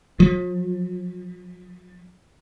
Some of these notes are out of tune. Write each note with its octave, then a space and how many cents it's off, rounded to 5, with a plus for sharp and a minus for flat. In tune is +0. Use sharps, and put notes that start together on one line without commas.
F3 +45